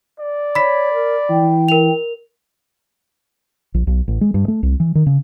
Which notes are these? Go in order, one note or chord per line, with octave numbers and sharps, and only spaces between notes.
D5
C#5 B5 B6
A#4
E3 G5
A#4 F7
A#1
B1
A1
G#3
G2
A3
C2
E3
D#3
C#3